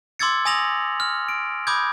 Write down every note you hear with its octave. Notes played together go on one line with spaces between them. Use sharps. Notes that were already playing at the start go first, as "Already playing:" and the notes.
C6 D6 E6 G#6 A6 C#7
G#5 D#6 A#6 F7 F#7
F6
D7
B5 D6 D#6 G6 G#6